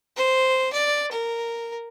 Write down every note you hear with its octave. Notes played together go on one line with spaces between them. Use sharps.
C5
D5
A#4